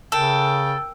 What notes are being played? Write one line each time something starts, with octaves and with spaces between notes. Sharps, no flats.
C#3 A4 A#4 G5